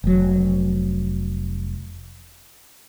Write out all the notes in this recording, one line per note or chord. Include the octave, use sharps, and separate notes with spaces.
F1 F#3